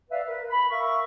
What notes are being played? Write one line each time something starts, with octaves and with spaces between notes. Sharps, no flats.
B4 D5 E5 F5
A#4 B4
B5
A#4 E5 F5 C#6